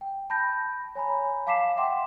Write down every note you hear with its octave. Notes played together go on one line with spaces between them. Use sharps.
G5
A5 B5 G6 A#6
C#5 G#5 A#5 B5
F5 A5 D6 B6 C7 E7
E5 F#5 G5 C6 D6